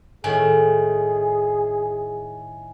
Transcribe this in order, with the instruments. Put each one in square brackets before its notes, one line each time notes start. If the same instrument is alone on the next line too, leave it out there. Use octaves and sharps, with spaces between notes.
[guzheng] A2 D#3 [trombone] G#4 [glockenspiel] G#5